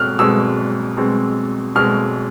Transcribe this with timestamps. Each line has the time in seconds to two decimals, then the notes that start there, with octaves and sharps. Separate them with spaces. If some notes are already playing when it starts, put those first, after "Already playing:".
Already playing: B2 G#3 C4 F6 F#6
0.19 B2 G#3 C4 E6
0.97 B2 G#3 C4
1.75 B2 G#3 C4 F6